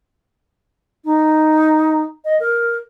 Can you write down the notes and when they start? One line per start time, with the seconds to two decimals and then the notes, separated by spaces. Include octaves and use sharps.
1.05 D#4
2.25 D#5
2.40 A#4